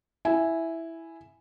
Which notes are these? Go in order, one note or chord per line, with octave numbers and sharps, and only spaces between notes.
E4 G#5